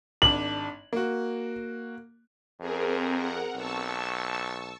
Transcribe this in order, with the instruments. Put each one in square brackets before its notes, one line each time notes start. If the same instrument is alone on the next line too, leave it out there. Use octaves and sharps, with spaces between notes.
[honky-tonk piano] G#1 D4 A5 [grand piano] F#7
[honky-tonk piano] A#3 F#4
[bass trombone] F2 [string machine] C4 G#4 A#4
[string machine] A#4 F#5 A#5
[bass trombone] B1 [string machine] A5 C#6 E6